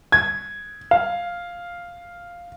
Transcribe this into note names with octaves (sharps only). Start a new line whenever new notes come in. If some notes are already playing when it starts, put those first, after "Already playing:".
G#6
F5